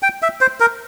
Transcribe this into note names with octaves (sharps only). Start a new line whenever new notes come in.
G5
E5
C5
A#4